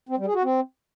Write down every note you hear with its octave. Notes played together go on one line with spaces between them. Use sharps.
C4
G3
G#4
F#4
C4